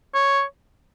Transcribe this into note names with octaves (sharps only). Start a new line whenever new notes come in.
C#5